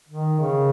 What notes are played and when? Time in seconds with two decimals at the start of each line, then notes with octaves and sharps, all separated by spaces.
0.09 D#3
0.40 C#3